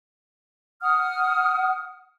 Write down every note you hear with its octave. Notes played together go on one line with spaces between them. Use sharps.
F#5 D#6 F6